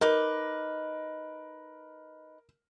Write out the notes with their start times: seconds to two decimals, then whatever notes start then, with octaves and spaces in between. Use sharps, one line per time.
0.01 D#4 A#4 B4 D6